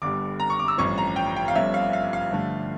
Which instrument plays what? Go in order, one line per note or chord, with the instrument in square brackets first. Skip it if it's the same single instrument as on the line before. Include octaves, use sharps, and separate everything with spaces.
[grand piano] G1 G2 D3 G3 D6
A#5
C#6
D6
E6
A1 G2 F3 C#4 C#6
A#5
G5
G5
F5
G1 G2 F3 C#4 E5
F5
F5
F5
G2 D3 F3 A3